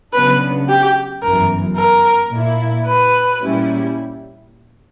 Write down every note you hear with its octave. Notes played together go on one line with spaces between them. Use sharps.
C#3 F#3 B3 D4 B4
G4
G1 F#2 E3 A#4
A#4
A#2 A#3 E4
B4
A#2 G3 C#4 E4